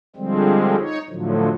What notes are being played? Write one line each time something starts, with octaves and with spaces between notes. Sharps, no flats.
D3 F3 G3 G#3 C4
D#4 C#5
A2 D3 F3 F#3